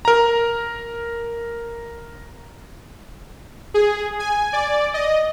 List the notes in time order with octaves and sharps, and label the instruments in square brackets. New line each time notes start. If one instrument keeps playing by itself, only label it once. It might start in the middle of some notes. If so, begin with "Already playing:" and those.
[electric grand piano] A#4 A#5
[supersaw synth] G#4
G#5
D5
D#5